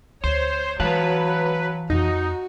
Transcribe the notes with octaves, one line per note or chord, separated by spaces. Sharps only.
D2 C5 C#5
E3 F#3 G#3 B4 F5 A5
F2 D#4 F#4